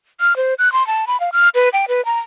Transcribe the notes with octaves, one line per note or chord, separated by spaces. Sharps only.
F6
C5
F#6
C6
A5
B5
F5
F6
B4
G5
B4
A#5